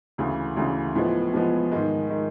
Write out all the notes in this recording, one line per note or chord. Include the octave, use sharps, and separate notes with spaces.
D2 C#3 E3
D2 C#3 E3
A2 F3 G#3 B3
A2 F3 G#3 B3
G#2 D#3 G#3
D#3 G#3